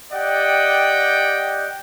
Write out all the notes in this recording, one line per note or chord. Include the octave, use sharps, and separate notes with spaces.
G4 D5 D#5 F#5 G5